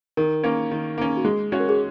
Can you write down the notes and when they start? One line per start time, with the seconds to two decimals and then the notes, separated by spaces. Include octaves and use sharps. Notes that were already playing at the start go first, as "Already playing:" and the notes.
0.17 D#3 A#4
0.44 A#3 C#4
0.71 D#3
0.98 A#3 C#4
1.17 F#4
1.25 G#3 G#4
1.52 C#4 F#4 C#5
1.59 A#4
1.69 G#4